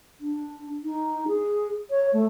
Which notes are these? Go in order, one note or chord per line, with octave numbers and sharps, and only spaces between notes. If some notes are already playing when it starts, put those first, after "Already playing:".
D4
D#4
G#4
C#5
A3